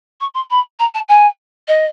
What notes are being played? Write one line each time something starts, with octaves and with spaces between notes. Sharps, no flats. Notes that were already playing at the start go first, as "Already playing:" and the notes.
C#6
C6
B5
A#5
A5
G#5
D#5